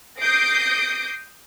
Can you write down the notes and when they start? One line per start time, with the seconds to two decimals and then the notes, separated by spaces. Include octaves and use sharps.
0.20 D6 D#6 G6 A#6 C7 D7